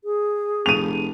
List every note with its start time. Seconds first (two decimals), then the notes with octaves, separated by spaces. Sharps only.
0.04 G#4
0.66 F1 D#7 F7